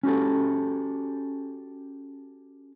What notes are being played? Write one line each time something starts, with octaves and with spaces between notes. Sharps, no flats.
C#4 F#4 G4 A4